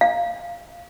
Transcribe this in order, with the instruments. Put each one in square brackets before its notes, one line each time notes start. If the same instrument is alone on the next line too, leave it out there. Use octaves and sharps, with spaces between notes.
[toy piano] F5